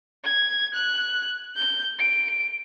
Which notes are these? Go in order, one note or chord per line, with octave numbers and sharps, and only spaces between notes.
G#6
F#6
G6
D7